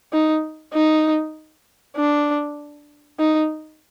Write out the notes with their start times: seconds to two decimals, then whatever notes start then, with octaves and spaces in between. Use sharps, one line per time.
0.13 D#4
0.74 D#4
1.96 D4
3.19 D#4